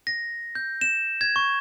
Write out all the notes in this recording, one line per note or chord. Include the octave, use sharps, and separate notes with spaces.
A#6
G6
E7
G#6
C#6